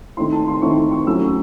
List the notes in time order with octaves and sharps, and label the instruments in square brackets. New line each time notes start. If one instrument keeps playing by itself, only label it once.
[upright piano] D#3 A3 C4 E4 C6
A5
C6
D#3 A3 C4 E4 C#6
C#6
F#3 A3 C#4 E4 E6